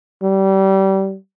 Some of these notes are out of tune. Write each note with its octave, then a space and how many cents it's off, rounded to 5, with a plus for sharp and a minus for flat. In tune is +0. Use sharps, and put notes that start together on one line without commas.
G3 -25